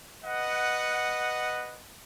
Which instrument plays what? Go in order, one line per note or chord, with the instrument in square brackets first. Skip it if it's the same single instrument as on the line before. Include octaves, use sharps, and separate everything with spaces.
[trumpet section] B4 D#5 F#5